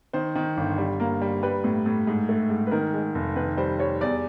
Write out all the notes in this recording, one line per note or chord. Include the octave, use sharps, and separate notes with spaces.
D#3 C5
D#3
G1
G3
A#3
G3
G3 B4
A2
A2
G#2
A3
G#2
B4
D#3 A#4
G#3
F1
D#3 B4
G3 C5
G3 C#5
E2 D5